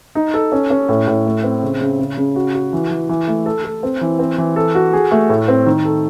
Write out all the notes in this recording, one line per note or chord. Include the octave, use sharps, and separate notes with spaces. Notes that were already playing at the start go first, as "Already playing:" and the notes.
D#4
A4
C#4
C#4
A2
A2
A3
C4
C#3
C#3
C#3
C#3
F#4
F#4
E3
E3
E3
A3
A4
A4
C4
E3
C4
E3
A4
F#4
G#4
A3
A2
C4
D#3
A4